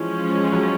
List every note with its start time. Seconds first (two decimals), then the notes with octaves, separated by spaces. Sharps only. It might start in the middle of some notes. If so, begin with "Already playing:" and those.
Already playing: E3 F3 G#3 C#4
0.53 F#3